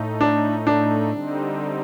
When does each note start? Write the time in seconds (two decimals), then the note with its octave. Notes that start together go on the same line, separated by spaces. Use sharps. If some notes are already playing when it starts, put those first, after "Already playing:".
Already playing: A2 A3 D#4
0.21 D4
0.67 D4
1.12 D3 G3 C4 D#4